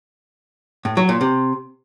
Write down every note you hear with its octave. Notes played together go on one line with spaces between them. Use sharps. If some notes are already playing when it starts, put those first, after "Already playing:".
A2
F#3
A#2
C3